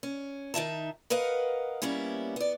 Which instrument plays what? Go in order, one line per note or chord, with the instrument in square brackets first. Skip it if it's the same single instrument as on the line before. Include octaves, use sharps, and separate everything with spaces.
[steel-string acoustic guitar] C#4
D#3 D#4 E5 A5
A#4 B4 D#5 F5 F#5
G3 A#3 B3 C#4 E4
B3 D5